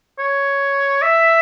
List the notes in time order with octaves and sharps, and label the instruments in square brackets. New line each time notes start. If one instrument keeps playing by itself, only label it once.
[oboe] C#5
E5